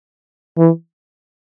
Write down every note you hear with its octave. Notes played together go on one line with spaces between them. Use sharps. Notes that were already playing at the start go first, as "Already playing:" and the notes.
E3